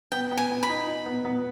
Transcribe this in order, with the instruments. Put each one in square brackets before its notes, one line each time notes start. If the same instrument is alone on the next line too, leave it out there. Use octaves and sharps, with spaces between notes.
[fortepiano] B3 [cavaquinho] G5
[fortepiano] B3
[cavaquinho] G#5
[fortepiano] B3
[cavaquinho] B5
[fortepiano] D#4
D#4
B3
B3